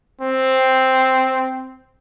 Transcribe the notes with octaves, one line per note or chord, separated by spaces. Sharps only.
C4